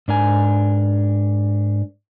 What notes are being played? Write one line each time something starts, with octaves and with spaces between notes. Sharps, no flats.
G#2 D4 A#4 G#5